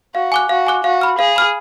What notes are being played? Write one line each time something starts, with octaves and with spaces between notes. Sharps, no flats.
F#4 F5
G#5 D6 F#6
F#4 F5
G#5 D6 F#6
F#4 F5
B5 F6
G#4 F5
B5 F6